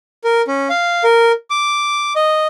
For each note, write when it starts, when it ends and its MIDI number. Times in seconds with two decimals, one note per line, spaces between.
0.24 0.42 70
0.48 0.68 61
0.69 1.04 77
1.04 1.32 70
1.50 2.13 86
2.16 2.47 75